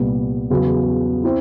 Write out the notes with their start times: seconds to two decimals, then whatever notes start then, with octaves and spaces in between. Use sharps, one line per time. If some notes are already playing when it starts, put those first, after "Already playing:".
Already playing: C2 A#2 G3 B3
0.50 E2 C#3 F#3 B3
1.24 C4 E4